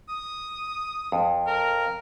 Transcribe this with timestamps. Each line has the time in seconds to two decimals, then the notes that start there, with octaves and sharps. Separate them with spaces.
0.09 D#6
1.12 F2
1.47 A#4